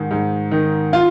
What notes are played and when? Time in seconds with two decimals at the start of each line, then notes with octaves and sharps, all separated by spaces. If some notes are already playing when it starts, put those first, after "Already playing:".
Already playing: G#2 D#3
0.11 G#2
0.52 D#3
0.93 F4